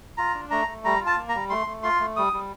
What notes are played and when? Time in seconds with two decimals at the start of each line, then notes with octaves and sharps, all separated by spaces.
0.17 F4 A#5
0.34 D4
0.51 A3 A#5
0.68 A3
0.84 G3 A#5
1.00 F4
1.06 A5
1.17 A#3
1.29 A#5
1.34 G3
1.50 A3 C6
1.67 A3
1.83 F4 C6
2.00 A3
2.16 G3 D#6
2.33 G3